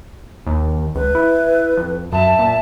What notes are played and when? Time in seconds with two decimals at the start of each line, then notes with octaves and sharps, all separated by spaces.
0.46 D#2
0.95 C#2 B4
1.15 E4
1.77 F2
2.12 F#2 E5 A5
2.39 A#2